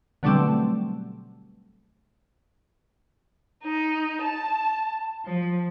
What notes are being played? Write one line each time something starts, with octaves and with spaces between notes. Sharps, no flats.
B2 D3 F#3 G3 A3 C4
D#4
A5
F3